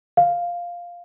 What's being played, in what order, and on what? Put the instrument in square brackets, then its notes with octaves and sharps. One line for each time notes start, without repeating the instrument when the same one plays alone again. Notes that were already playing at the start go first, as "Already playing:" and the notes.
[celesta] F5